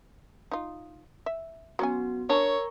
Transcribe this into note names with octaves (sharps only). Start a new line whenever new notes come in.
D#4 F4
E5
F#3 B3 C#4 F#4 G#5
D4 A#4 C#5 A#5 C#6